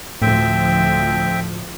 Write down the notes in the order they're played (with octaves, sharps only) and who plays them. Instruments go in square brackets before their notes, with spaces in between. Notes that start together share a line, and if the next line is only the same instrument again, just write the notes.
[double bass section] D2 F3 [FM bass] A2 [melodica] C4 E5 G5